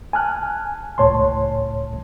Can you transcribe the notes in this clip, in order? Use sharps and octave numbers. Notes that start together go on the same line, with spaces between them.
G#5 A5 F6 F#6
C#2 A2 C#5 A5 C6